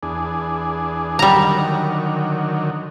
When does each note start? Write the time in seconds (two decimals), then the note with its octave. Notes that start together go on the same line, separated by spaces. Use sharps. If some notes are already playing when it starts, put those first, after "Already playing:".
0.03 E2 D4 G#4
1.19 D3 D#3 F#3 G3 A#5